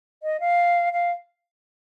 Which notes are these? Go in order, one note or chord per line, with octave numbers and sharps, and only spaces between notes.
D#5
F5
F5